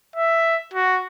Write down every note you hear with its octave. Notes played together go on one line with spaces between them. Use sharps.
E5
F#4